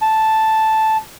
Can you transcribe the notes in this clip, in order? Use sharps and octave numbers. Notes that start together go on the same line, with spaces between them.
A5